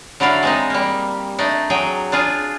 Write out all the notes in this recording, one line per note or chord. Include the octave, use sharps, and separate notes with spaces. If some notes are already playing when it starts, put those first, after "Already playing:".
D3 F#3 E4 D5 F5
G#3 C4 D#4
G3 A#3
A3 D4 D#4
F#3 G#4 G5
D4 F4 G#4